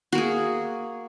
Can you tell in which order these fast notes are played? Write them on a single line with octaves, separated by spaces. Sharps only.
F#4 A#3 G#4